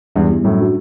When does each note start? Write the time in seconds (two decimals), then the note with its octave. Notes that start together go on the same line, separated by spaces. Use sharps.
0.16 E2 G2 G3
0.30 B3 E4 G4
0.44 F#2 A2 G3
0.59 D4 F#4